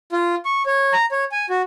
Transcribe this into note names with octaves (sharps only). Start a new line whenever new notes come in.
F4
C#6
C#5
A#5
C#5
G#5
F#4